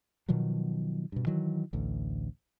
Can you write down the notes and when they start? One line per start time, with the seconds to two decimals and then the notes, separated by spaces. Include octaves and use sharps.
0.29 B2 D#3 F3 F#3
1.12 G2 B2
1.27 D#3 E3 F#3
1.73 A1 D2